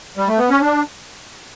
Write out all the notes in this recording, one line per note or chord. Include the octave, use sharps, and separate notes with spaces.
G3
A3
B3
C#4
D4